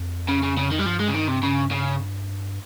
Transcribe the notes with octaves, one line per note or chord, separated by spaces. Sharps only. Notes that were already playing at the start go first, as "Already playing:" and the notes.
Already playing: F2
C#3
C#3
C#3
D#3
G3
G2 F3
G#3
C#3
D#3
C3
C#3
C#3